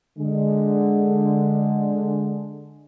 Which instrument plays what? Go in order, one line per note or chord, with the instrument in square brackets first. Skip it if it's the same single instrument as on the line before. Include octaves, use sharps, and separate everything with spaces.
[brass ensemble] D3 G#3